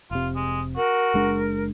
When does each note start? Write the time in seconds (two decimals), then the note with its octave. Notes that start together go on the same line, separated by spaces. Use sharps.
0.11 F1 C3 F4
0.36 G#3
0.77 F#4 A#4
1.14 F#1 G#3 D4